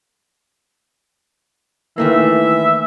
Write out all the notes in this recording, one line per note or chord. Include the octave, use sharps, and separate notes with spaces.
D#3 E3 A3 A#3 E5